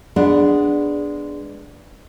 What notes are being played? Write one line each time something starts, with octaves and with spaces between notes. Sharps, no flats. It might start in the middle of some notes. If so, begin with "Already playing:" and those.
G#3 B3 D4